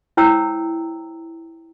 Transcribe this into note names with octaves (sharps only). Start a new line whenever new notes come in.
E4 C5 C#5 G5 A#5 E6